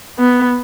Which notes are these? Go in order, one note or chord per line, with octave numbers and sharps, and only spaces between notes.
B3